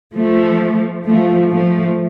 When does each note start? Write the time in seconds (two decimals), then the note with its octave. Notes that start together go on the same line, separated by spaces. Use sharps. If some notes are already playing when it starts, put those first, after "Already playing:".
0.14 F3 A3
1.06 F3 A3
1.51 F3 A3